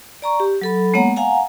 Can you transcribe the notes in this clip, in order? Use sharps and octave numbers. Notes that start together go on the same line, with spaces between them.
D5 A#5 C#6
G4
F#3 A4 B5
G#3 A#3 B3 C#5 F#5 A#5
F5 F#5 G#5 A#5